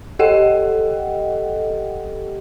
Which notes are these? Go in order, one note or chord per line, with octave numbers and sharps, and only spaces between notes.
G4 A4 D#5 F#5 G5